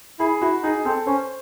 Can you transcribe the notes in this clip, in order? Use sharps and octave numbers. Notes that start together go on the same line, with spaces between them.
E4 G#4
E4 F#4
D#4 G#4
C4 A4
C#4 C5